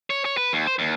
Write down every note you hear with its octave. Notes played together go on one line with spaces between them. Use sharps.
C#5
C#5
B4
D#2
C5
D#2